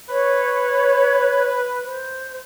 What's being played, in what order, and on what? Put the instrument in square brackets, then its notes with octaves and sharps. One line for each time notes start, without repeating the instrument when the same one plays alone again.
[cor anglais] B4 [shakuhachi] C#5
[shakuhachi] C5